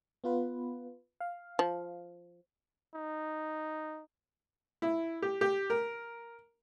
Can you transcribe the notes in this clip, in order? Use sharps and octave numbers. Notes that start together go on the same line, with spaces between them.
B3 F4 B4
F5
F3
D#4
E4
G4
G4
A#4